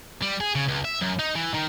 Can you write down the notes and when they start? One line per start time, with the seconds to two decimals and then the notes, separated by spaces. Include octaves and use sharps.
0.22 G3
0.41 G#4
0.55 C#3
0.68 C#2
0.85 E5
1.02 F#2
1.19 D#4
1.35 E3
1.54 D#3